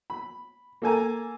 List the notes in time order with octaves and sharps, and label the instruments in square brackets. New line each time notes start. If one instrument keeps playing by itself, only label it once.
[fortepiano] B5
A#3 A4 G#5 A#5